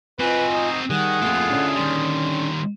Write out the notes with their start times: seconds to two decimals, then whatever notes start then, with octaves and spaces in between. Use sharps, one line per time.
0.19 C4 F4 F#4 B4 D#5 G#5
0.53 D#4
0.90 D#3 G3 G#4 F#5 F#6
1.22 F2 A3 A#3 E4 F4
1.50 D3 C#4 D4
1.76 D#3 G3 C6